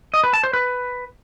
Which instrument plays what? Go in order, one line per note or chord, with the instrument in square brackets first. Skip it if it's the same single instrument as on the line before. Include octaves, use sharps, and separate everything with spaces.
[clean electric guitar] D#5
B4
A5
C5
B4